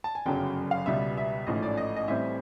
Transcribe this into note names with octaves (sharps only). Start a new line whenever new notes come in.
A5
G#5
G1 F#2 C#3 F#3 G5
F5
C#2 B2 G3 B3 E5
E5
A1 G#2 F3 A3 C#4 D#5
D5
D#5
D#5
A1 A2 E3 G3 C4 E5